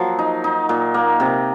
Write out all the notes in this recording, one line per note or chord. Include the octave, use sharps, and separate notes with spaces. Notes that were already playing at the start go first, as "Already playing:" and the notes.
Already playing: F3 F#3 A#3
D#4
D#4
A#2
A#3
C3